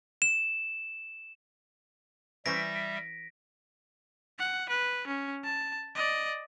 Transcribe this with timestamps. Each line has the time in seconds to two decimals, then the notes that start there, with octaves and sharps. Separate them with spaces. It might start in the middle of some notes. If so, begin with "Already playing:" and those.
0.22 E7
2.46 E3 G3 C#4 C5 E5 A#6 B6 D7
4.39 F#5
4.69 B4
5.07 C#4
5.44 A5
5.95 D5 D#5